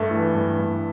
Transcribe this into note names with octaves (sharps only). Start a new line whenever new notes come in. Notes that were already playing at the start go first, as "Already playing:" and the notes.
Already playing: G2 A3
E3
G2
G2